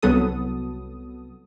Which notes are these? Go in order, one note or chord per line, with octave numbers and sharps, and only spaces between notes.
C2 F#3 B3 A4 D#6